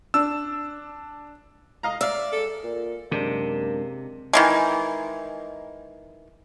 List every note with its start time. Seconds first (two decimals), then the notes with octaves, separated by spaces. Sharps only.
0.14 D4 E6
1.83 D#5 F5 A#5
2.01 D5 E5 F5
2.32 G#3 A4
2.64 A#2
3.12 F#2 C3 G#3 A#3 D4
4.33 D#3 E3 G#3